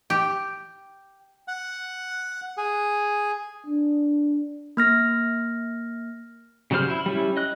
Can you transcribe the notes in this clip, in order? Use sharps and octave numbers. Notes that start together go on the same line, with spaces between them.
G4
F#5
G#4
D4
A#3 F6 A#6
C#3 F#3 G3 C5 F6
E4
G3 C#4 E4
D#5 F#6